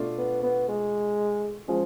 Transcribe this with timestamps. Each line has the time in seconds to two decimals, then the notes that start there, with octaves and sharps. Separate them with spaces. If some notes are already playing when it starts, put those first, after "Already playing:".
Already playing: B2 A3 D4 F4
0.18 B3
0.43 B3
0.68 G#3
1.68 F3 G#3 C#4 F4